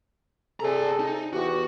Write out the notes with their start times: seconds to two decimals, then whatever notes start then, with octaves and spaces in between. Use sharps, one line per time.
0.60 C3 G#4 A4 D5 A#5
1.00 D#4
1.33 E2 F#4 G4